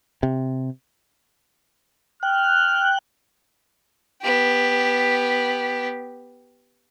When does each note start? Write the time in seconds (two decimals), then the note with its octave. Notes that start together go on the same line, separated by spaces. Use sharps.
0.23 C3
2.23 G5 F6 F#6
4.22 B3 G4